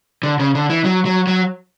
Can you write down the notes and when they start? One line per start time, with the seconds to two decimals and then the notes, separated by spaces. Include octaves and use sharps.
0.23 D3
0.39 C#3
0.55 D3
0.70 E3
0.85 F#3
1.05 F#3
1.27 F#3